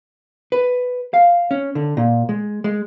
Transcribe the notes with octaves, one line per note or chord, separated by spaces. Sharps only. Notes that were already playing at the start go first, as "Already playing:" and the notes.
B4
F5
C#4
D3
A#2
G#3
G#3